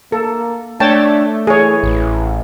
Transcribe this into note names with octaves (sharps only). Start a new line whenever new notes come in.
A#3 A4
A3 D4 C#5 G5 A5
E3 G#4 C#5
A1